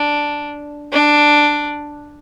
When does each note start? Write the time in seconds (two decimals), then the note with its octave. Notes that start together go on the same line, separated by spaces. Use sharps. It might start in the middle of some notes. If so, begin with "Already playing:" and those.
Already playing: D4
0.93 D4